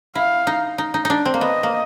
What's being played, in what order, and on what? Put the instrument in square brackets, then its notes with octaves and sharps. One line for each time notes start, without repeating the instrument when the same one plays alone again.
[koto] E4 [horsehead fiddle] F5
[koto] D#4
D#4
D#4
D4 D#4
C4
A#3
[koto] B3 [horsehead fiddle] D#5
[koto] A#3